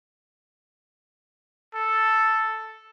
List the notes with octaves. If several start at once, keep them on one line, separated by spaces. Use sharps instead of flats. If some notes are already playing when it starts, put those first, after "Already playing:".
A4